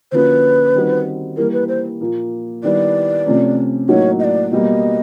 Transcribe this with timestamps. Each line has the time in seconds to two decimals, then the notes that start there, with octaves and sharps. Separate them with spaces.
0.12 D3 F3 A#3 C#4 F#4 B4 C5
0.75 D#3 G3 C4 D#4 F#4
1.37 E3 G3 A#3 A#4
1.53 B4
1.68 C5
2.01 A#2 F3 A#3
2.63 D#3 G3 B3 E4 D5
3.26 C3 F3 A3 C#4
3.89 A2 F#3 A#3 D#4 F#4 C#5
4.20 D#5
4.24 D5
4.52 B2 G3 A#3 D#5